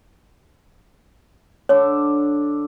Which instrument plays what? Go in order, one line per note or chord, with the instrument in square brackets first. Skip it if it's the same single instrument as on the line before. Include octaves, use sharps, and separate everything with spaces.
[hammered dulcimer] D3 D4 A4 [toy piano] C#5